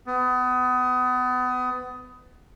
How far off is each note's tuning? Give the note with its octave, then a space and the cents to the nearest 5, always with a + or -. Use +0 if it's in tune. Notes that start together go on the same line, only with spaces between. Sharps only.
B3 +30